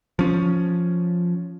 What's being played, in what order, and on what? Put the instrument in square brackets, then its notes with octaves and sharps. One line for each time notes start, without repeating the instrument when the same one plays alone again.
[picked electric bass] F3 C#4